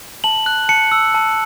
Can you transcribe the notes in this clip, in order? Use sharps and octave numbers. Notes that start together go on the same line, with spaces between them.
A5 F#7
F#6
A5 C#7
E6
A5